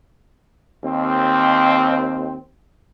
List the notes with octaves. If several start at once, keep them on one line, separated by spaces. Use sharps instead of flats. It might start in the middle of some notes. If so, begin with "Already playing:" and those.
D#2 C4